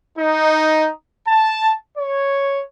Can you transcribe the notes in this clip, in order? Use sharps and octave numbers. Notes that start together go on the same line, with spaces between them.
D#4
A5
C#5